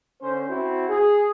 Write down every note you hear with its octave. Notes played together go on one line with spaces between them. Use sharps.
D3 C#4 C5
C4 E4 F#4
G#4